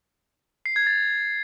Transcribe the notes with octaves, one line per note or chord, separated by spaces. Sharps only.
C7
G#6
A6